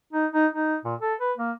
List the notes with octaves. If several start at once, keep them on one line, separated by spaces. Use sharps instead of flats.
D#4
D#4
D#4
A#2
A4
B4
A#3